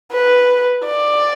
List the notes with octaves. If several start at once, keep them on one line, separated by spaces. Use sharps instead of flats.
B4
D5